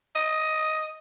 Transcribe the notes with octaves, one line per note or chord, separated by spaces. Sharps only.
D#5